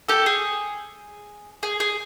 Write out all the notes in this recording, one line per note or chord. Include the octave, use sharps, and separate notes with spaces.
G4 A4
G#4
G#4
G#4